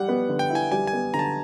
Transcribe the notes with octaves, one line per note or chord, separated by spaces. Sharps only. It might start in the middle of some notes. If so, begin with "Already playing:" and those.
Already playing: G3 F#5
B3
D3
G5
E4
G#5
G3 G#5
G#5
B3
D3 A#5
A5